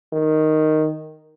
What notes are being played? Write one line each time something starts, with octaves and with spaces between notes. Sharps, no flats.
D#3